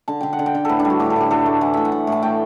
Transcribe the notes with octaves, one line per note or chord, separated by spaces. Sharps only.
D3 A5
D3 G5
F#5
D3
G5
D3
A2 A4 B4
D4
G3
F#4
A2 G4
A4
A2 G4
A2 A4
A3 D5
E3 F#5
A2 E5
F#5
A2
A2 A5
A3 G5